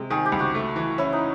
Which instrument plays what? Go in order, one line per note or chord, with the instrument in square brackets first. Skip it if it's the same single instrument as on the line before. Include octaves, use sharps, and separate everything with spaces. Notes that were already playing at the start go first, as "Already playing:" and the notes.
Already playing: [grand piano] C3 G#3
[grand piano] D#3 [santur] G#4
[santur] G4
[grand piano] C#2
[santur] F#4
[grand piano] A3
E3
[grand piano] C#4 [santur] E4
[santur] D#4